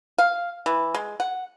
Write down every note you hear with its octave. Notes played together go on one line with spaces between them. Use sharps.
F5
E3
G#3
F#5